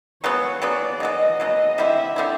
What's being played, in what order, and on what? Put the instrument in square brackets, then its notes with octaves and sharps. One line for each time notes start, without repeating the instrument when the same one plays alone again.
[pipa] C#3 F#3 B3 [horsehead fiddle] C#5
[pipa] C#3 F#3 B3 [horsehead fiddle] D5
[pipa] C#3 F#3 B3 [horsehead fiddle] D#5
[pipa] C#3 F#3 B3 [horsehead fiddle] D#5
[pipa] D3 G3 C4 E4 [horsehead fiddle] E5
[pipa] D3 G3 C4 E4